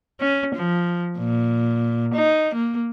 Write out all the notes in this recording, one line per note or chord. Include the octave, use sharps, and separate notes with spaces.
C#4
F3
A#2
D#4
A#3